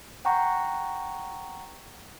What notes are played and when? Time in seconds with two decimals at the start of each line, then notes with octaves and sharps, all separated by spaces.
0.25 F#5 G5 A#5 C#6